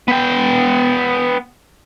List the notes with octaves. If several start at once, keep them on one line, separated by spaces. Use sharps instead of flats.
B3 G5